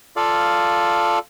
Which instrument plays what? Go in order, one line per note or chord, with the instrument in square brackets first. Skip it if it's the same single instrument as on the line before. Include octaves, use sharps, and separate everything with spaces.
[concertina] F4 A4 D5 F5